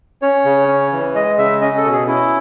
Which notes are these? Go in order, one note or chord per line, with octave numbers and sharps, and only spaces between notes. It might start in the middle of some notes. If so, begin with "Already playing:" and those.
C#4 C#5
C#3
C#4
E3
G#3 D#5
C#3 E5
C#4 D#5
A4
B2
G#4
C#4 E4